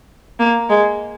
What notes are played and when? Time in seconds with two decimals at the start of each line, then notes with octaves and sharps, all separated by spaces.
0.39 A#3
0.70 G#3